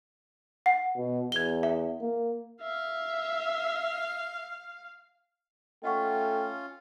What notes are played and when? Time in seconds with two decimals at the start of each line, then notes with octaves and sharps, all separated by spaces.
0.66 F#5
0.97 B2
1.32 E2 G#6 G7
1.63 E5
2.01 A#3
2.62 E5 F5
5.83 A3 C#4 F4 D#5 F#5 G5 C#6